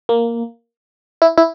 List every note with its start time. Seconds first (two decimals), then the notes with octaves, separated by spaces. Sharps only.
0.09 A#3
1.22 E4
1.38 E4